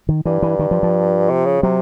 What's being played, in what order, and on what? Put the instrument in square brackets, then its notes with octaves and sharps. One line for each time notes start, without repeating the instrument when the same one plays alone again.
[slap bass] D#3
[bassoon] G2 [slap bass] E3
[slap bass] E3
D#3
F3
F3
[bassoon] C3
C#3
[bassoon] C3 [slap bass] F#3